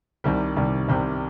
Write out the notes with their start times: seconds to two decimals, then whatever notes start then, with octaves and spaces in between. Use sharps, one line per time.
0.24 C2 C3 D#3 G3
0.56 C2 C3 D#3 G3
0.88 C2 C3 D#3 G3